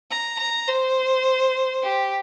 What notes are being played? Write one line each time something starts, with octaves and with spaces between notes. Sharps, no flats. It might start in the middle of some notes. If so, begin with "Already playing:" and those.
A#5
A#5
C5
G4